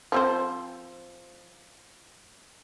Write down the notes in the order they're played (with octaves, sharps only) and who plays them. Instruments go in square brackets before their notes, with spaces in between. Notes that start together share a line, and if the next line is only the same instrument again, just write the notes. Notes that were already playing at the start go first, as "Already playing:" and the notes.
[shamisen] F3 C4 C5